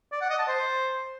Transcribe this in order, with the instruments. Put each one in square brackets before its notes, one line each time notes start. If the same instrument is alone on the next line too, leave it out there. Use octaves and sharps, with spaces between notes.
[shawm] D5
F#5
D#5
A5
C5